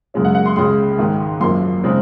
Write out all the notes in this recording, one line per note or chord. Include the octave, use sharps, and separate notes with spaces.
F#1 F#2 C#3 G#3 C#4
F#5
F#5
C6
C#2 C#3 G#3 C6
G#1 G#2 D#3 G#3
F#1 F#2 F3 A#3 C6
C#3 G#3 C4 D#4